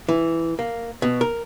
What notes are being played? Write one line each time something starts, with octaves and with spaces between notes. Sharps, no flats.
E3
A#3
B2
A#4